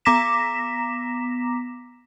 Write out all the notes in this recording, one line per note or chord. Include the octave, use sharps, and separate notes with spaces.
B3 A#5 D6 A#6 B6 E7